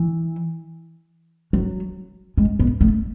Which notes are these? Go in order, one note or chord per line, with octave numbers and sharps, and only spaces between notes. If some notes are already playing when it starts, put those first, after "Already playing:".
Already playing: E3
F#3
G#3
B3
A3